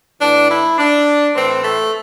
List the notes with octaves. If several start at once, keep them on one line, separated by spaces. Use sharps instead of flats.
A2 E3 D4
E4
D4
A2 E3 C4
A3